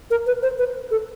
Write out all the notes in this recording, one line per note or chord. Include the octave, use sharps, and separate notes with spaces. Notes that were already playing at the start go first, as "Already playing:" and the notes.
A#4
B4
C5
B4
A4